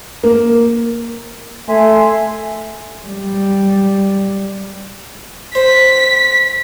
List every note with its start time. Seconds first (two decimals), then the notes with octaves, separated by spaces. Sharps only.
0.23 A#3
1.69 A3 E5 G#5 C6
3.08 G3
5.55 C5 B6